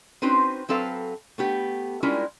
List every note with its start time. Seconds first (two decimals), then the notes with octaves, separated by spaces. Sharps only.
0.22 C4 C#4 D#4 F#4 B4 C5
0.69 F#3 C4 A4 B4 F5
1.38 A3 B3 G4
2.03 G3 G#3 C#4 E4 F4 A#4